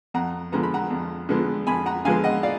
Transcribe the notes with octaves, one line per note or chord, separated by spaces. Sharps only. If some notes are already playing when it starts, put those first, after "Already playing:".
F2 F#5 A#5
D3 F3 G#3 B3 A#5
B5
F#5 A#5
F2
D3 F3 G#3 B3
F2 G#5 B5
F#5 A#5
D3 F3 G#3 B3 F5 G#5
D#5 F#5
D5 F5